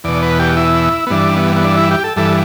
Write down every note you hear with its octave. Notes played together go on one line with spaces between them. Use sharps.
E2 B2 D5
B4
G4
E4
B3
G2 E3 D4
B3
B3
D4
E4
G4
A4
G2 E3 A4